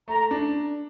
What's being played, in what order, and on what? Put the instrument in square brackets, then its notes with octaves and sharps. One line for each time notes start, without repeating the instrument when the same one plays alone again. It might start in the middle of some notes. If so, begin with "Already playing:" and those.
[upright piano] A3 [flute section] A#5
[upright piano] D4